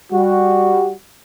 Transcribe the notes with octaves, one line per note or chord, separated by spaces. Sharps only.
G3 F#4